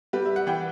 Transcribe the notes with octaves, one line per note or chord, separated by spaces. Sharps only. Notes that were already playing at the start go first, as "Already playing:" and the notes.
G3 G4 B4
E5
F#5
E3 G5